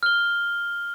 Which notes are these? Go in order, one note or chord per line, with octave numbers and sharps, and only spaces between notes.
F6 G7